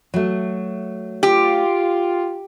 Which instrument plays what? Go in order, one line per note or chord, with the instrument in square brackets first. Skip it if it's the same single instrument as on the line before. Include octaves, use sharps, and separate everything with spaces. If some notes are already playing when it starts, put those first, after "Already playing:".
[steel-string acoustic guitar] F#3 A3
[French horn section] F4 [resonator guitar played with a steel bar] G4